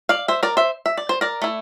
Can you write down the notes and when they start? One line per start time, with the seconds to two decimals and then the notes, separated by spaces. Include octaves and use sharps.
0.09 D5 F5
0.28 C5 E5
0.43 A#4 D5
0.57 C5 E5
0.86 E5
0.98 D5
1.09 C5
1.21 A#4 D5
1.42 A3 E4